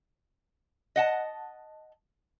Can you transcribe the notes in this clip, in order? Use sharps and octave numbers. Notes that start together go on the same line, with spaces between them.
D#5 F#5 A5